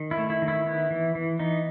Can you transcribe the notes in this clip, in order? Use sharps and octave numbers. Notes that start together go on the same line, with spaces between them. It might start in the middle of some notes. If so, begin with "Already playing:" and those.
Already playing: D#3
E4
A3
E4
D#3
E4
B3
E3
E3
B3 D#4